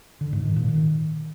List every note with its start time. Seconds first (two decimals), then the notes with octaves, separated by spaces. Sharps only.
0.21 D3
0.33 G#2
0.44 D#3
0.56 A#2
0.68 D#3